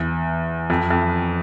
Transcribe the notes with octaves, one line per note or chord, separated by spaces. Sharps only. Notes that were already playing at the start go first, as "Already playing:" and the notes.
Already playing: E2
F2
F2